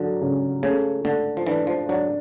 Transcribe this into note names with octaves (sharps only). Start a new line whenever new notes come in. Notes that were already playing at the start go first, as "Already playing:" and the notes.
Already playing: D3 F#3
C#3
C#3 A3
D3 A3
F3
E3 D4
F3
F#3 D4